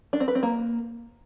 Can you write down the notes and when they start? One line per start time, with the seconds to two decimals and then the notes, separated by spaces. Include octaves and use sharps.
0.13 D4
0.20 C4
0.28 B4
0.35 C4
0.43 A#3